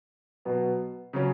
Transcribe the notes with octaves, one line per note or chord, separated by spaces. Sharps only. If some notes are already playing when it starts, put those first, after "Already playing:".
B2 F#3 B3
C#3 F#3 C#4